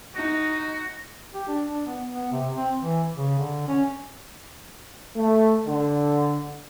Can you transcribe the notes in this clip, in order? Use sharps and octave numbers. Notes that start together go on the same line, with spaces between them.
D#4 F#4
G4
D4
D4
B3
B3
C3
C4
E3
C#3
D3
C#4
A3
D3